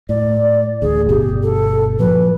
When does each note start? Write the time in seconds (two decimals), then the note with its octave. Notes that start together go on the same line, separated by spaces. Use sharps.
0.09 A2 D5
0.82 A1 D2 G#4
1.09 G1 B2 G4
1.43 A4
1.99 A#2 F3 F#3 B4